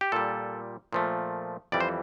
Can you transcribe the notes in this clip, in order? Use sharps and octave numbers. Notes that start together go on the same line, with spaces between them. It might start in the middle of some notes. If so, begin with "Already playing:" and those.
G4
A#2 G3 A4
A#2 F3 A3
F2 E3 G3 D5
C5